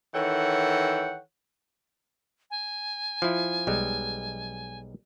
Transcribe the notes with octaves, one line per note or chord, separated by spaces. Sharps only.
D#3 E3 A4 C#5 F#5 G5
G#5
F3 E4
B1 G3 G#3